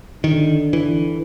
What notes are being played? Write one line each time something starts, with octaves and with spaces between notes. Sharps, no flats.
D3 D#3
E3